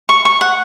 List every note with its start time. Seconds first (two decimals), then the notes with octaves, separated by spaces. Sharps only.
0.09 C#6
0.25 C#6
0.41 F#5